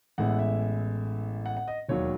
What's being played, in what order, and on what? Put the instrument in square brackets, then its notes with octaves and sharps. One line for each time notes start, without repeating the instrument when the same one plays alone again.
[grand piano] A1 A2 G#3 B3 E4 F#5
E5
F#5
F#5
D#5
E1 D#2 D#3 F#3 C#5